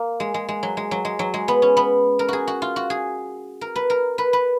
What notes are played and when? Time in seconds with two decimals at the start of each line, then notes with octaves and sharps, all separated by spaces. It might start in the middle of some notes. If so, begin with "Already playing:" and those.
Already playing: A#3
0.20 G#3
0.34 G#3
0.49 G#3
0.63 F#3
0.77 G#3
0.91 F#3
1.05 G#3
1.19 F#3
1.34 G#3
1.48 B3
1.62 C#4
1.77 B3
2.19 A#4
2.29 F#4 G#4
2.48 F#4
2.62 F4
2.76 F#4
2.90 G#4
3.61 A#4
3.76 B4
3.90 A#4
4.18 B4
4.33 B4